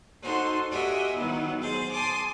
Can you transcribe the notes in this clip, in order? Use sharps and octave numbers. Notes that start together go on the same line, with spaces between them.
D#4 F#4 A4 C5 C6
F#4 G4 A#4 D#5 E5 G#5
D#3 F#3 B3 E4
G#4 C5 G6 A6
G#5 A5 C6 D6 D#6